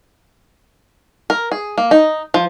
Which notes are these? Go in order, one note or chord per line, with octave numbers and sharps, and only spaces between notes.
A#4
G#4
A#3
D#4
F3